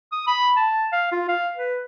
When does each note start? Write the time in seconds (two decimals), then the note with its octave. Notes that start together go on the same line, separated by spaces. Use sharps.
0.12 D#6
0.28 B5
0.57 A5
0.93 F5
1.12 F4
1.29 F5
1.57 B4